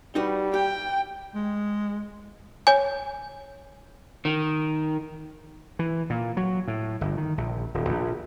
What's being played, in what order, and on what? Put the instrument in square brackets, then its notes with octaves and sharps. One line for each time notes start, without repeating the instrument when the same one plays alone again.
[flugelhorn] G3 [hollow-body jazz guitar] D#4 F#4 B4
[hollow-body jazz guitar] G4 [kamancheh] G5
[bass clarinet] G#3
[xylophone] C#5 G#5
[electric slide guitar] D#3
[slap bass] E3
A#2
F#3
A2
G1
D#3
A#1
D#1
A#1